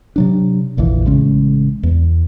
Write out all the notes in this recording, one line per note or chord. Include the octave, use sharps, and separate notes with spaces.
C3 F#3 D4
F1 A#1 F2 E3
A1 C#3 G#3 C#4
E2